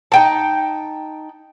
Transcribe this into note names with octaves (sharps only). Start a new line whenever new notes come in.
D#4 G5 A5